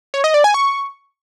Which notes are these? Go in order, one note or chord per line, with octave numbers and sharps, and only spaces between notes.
C#5
D#5
D5
G#5
C#6